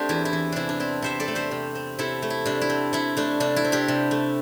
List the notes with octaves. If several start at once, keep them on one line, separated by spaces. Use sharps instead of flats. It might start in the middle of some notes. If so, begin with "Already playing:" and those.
Already playing: A3 C4 D4 G4 A4 C5
E2 E4
E4
E3
C3 D4 E4
D4
C4 E4
C3 C5 E5
A4 D5
A3
G4 C5
C3
C4
C3 E4 A4
A3
E4
C3 D4
E4
C4
C3 E4
A3 D4
C3 D4
E4
C4
D4 G4
C3
A3